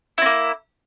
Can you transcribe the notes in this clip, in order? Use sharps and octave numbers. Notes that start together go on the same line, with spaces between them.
A#3 C4 E4